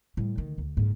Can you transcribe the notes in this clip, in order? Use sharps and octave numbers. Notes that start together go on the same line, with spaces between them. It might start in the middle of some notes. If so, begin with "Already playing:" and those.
A2 G3
D2 D#3
D2
F#1 G#2